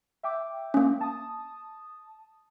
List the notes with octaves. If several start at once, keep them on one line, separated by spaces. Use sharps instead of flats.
E5 G5 D6
A#3 C#4
A5 D#6